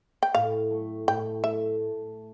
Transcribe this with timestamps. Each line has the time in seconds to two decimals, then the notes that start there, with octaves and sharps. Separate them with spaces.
0.23 G5
0.35 A2 F5
0.71 A3
1.07 A2 G5
1.44 A3 E5